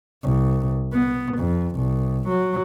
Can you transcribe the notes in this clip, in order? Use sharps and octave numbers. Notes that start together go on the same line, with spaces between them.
C2
B3
F2
C2
F#3